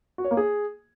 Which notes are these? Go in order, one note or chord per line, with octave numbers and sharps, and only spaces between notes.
F#4
C#5
A#3
G#4